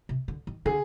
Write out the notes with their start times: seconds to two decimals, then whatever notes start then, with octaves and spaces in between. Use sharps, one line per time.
0.09 C3
0.28 D3
0.47 D#3
0.66 D3 G#4